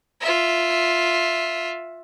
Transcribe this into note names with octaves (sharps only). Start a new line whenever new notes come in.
F4 E5